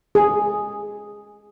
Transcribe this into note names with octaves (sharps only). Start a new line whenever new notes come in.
G#4